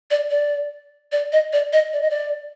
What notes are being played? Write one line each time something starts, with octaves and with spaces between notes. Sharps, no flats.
D5
D5
D5
D#5
D5
D#5
D5
D#5
D5